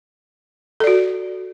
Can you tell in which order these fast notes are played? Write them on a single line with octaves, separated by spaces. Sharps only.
A4 D5 F#4